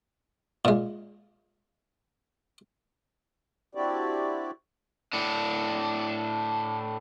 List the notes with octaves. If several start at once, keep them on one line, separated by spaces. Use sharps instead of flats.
A#2 G#3
C4 D4 E4 F#4 G4 D5
A2 D4